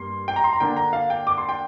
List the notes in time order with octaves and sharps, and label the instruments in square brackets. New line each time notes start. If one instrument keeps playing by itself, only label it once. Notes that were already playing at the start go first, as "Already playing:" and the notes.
Already playing: [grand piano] G2 G3 A#3 C6
G5
A#5
C6
A#5
D3 A#3 D4 G5
A#5
F5
G5
D6
C6
G5